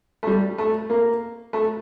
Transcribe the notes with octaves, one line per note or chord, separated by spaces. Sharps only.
A3
G3
A3
A#3
A3